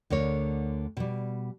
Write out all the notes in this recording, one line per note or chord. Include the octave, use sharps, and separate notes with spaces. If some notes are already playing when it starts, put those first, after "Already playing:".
D2 D3 A#4 C#5
B2 G3